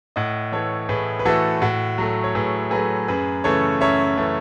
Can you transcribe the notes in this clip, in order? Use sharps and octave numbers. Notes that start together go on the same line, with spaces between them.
A2 D#5 F#5
E3 A3 A4 C#5
A2 G#4 B4
B4
E3 A3 F#4 A4
A2 F#4
F#3 A3
C#5
A2 G#4 B4
F#3 A3 G#4 B4
F#2 G#4 B4
C#3 E3 A3 A4 C#5
F#2 C#5 E5
C#3 E3 A3